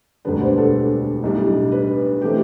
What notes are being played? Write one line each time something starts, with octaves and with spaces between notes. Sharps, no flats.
E1 D2 D3 G3 D4 B4
C5
A4
A4
B1 A2 G3 D4
B4
E3 A3 C4 G4